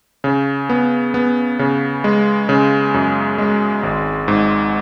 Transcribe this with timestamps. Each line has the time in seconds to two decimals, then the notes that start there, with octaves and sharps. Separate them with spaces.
0.24 C#3
0.70 B3
1.14 B3
1.59 C#3
2.04 G#3
2.49 C#3
2.94 F#2
3.38 G#3
3.83 G#1
4.28 G#2